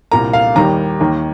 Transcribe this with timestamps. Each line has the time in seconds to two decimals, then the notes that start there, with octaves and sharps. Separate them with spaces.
0.11 C2 A#2 A#3 A#5
0.33 F5
0.56 D#2 D#3 G3 A#3 A#5
1.00 D#2 D#3 A#3